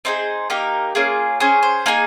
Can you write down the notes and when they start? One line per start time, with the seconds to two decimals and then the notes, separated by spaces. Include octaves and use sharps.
0.05 C4 D#4 G#4 C5
0.50 A#3 D#4 G4 A#4
0.95 A#3 C#4 F4 G#4
1.40 C#4 G#4 C5
1.63 C5
1.86 A#3 D#4 G#4 G#5